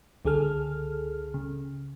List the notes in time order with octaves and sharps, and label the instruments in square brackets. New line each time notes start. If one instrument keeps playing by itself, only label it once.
[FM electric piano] C#2 D3 G#4 A4 F6
C#3